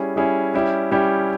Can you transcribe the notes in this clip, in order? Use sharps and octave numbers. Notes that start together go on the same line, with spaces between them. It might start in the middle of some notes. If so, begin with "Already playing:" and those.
Already playing: G3 C#4 E4 G#4
G3 C#4 E4 G#4
G3 C#4 E4 G4
G3 C#4 E4 G4